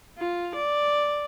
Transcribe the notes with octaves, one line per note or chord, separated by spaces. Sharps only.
F4
D5